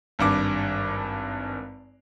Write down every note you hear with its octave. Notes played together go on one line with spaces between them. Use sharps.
G#1 G2 D6